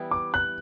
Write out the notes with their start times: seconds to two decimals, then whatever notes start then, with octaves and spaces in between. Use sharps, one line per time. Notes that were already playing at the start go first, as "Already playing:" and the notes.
Already playing: E3 G3 B3 E4
0.11 D6
0.34 F#6